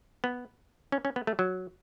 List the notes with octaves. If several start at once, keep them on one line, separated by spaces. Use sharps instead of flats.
B3
C#4
C#4
B3
A3
F#3